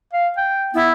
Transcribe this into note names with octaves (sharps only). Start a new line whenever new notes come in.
F5
G5
B3 E4